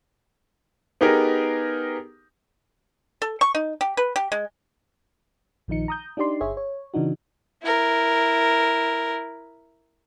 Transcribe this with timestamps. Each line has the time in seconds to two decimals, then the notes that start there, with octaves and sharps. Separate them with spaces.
1.01 B3 D#4 G4 G#4 A#4
3.22 A4
3.41 C#6
3.55 D#4
3.81 G4
3.97 B4
4.16 G4
4.32 G#3
5.68 A#1 D#3 F3 D#4 C#7
5.88 A#5 D#6 G6
6.17 D4 D#4 G4 D5 C6
6.40 G1 G#4 C#5 E5
6.57 C#5
6.94 C#3 E3 D4 D#4 F#4
7.63 E4 A#4